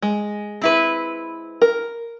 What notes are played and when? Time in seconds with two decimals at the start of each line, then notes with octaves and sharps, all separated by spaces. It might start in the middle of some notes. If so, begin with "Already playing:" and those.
0.02 G#3
0.62 C4 E4 B4
1.62 A#4